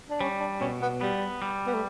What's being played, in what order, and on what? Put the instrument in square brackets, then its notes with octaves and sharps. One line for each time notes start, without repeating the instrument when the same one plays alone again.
[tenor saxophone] D4
[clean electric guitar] G3 [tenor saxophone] C#4
[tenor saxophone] D4
[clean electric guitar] B2 [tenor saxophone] C#4
[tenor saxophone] B3
[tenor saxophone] G3 [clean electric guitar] B3
[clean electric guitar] G3
[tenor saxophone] B3
A3